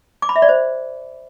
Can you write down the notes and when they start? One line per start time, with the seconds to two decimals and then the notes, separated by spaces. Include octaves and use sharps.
0.22 D6
0.29 B5
0.36 E5
0.42 D5
0.49 C5